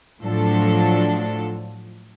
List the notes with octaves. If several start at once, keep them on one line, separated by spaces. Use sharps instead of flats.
A2 F3 F#3 D4 A4